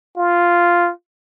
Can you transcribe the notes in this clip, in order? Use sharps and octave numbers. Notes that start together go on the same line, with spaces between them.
F4